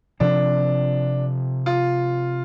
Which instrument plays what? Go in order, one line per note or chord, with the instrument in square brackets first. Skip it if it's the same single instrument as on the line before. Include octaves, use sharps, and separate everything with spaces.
[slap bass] C3 F3 C4 [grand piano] D4
[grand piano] F4